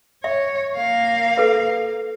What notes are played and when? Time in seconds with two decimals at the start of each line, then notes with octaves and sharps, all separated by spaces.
0.24 C#5 E5
0.77 A#3 F5
1.38 A4 B4